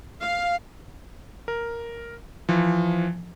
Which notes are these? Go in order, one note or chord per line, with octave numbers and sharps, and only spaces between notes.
F5
A#4
E3 F3